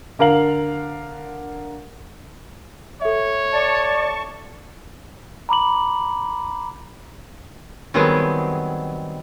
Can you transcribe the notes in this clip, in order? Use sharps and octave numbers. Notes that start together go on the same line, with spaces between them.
D3 A#4 F5 F#7
A4 C#5 E5
D5 A5 C#6
A#5 B5 D6 F#7
D#3 F#3 G3 B3 C4 G#4